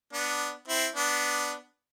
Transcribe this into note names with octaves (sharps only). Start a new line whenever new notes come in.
B3 D4
C4 E4
B3 D4